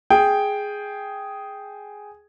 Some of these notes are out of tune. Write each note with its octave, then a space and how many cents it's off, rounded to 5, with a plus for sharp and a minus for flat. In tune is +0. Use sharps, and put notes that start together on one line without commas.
G#4 +0 G5 +0